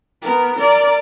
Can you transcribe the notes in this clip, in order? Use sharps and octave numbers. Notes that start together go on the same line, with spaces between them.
B3 A#4
A#4 D5